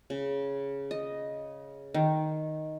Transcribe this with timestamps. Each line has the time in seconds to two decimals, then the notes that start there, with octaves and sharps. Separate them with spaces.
0.10 C#3
0.91 D#5
1.94 D#3